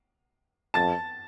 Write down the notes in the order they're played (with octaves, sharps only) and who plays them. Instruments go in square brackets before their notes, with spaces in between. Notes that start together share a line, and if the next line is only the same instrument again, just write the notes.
[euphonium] F2 [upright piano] A5 A6